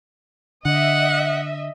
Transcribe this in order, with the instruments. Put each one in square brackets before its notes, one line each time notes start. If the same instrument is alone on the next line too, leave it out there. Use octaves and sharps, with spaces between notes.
[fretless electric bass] D3 [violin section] D#5 E5 [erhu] F#5